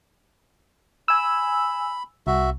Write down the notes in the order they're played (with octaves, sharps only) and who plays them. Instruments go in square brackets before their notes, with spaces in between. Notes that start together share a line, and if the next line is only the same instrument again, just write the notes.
[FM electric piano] G#5 E6 [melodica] B5
[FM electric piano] C2 [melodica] F#4 E5